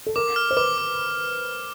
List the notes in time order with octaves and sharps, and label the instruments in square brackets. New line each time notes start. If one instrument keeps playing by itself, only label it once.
[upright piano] A4
[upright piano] A#4 [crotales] D6
[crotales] F6
[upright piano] C5
[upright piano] B4 [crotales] D6
[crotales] D6